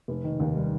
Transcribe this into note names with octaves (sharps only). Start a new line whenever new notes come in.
F1
D#3
D#2
G3